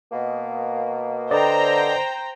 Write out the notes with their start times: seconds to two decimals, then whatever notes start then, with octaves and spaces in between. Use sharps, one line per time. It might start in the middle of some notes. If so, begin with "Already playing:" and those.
0.11 B2 A#3
1.31 D3 B4 C5 D5 D#5 G5 A#5